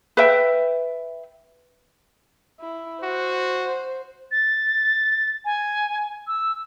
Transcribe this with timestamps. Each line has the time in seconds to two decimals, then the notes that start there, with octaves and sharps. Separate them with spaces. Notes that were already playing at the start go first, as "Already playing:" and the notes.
0.17 B4 E5 G5
2.60 E4
3.03 F#4 C5
4.32 A6
5.45 G#5
6.27 E6